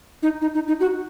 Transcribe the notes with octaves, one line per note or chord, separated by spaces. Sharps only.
D#4
D#4
D#4
D#4
F#4